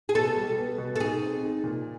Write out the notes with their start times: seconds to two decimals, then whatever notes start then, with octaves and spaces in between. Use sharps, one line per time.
0.09 G#4
0.15 B2 A4
0.37 G3
0.58 B3
0.78 B2
0.96 A4
1.00 D#4 G#4
1.22 C4
1.43 D#4
1.64 A#2